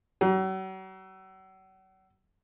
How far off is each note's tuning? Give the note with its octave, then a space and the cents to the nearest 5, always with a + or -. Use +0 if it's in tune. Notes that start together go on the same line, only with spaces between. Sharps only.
F#3 +40